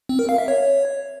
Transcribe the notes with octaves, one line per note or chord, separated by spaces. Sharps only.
C4
A#4
F5
E5
C#5